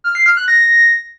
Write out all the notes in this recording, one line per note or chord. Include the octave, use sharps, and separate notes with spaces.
F6
C7
F6
F#6
A#6